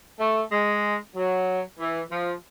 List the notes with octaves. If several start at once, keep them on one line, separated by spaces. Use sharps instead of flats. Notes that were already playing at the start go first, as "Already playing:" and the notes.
A3
G#3
F#3
E3
F3